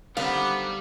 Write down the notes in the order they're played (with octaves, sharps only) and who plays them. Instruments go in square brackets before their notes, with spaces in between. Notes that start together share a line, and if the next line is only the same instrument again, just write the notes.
[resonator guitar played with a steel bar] D3 D#3 C4 [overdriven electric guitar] G3 [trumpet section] B3 [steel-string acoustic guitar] F5